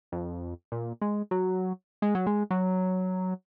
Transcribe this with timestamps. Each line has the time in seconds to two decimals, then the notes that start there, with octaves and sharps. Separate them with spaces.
0.12 F2
0.72 A#2
1.02 G#3
1.31 F#3
2.02 G#3
2.15 F#3
2.27 G#3
2.51 F#3